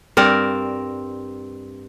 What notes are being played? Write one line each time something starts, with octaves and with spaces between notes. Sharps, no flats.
G2 C4 A#4 D5